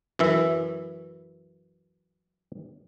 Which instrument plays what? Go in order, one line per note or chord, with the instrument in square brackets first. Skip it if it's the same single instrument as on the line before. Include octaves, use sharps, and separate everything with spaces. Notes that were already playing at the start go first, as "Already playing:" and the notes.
[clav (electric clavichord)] F#2 E3 E5